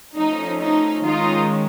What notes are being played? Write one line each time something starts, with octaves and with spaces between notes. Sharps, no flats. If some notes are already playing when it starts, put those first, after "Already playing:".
F3 A3 C#4 D#4
D#4
D#3 G#3 C#4 D#4 F4